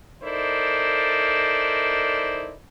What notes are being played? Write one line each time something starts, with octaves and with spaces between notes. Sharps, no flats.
D#4 E4 A4 A#4 C5 D5